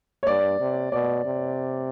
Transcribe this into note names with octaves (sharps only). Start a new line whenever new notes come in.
C#5
G2 D5
C3
B2 D5
C3